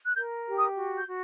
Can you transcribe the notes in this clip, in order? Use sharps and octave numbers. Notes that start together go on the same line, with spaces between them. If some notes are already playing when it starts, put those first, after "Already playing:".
F#6
A#4 G6
G4
D#6
F#4
G6
F#4